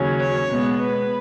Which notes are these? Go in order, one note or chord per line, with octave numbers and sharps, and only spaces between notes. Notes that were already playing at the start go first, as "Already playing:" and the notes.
Already playing: D#2 C#3 F#3 C#4
C#5
B2 G#3 B3
B4